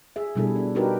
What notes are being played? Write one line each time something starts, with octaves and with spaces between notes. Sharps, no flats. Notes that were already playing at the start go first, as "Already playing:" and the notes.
G#4 E5
B2 G3 D4 E4 G#4 A4
D4
D4 D#4 F#4 G4 A#4 B4